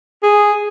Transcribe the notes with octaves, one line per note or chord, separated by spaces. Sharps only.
G#4